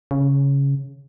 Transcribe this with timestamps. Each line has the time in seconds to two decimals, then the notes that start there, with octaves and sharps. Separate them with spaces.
0.11 C#3